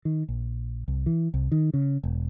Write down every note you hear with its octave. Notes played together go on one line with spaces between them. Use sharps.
D#3
A#1
C2
E3
C2
D#3
C#3
E1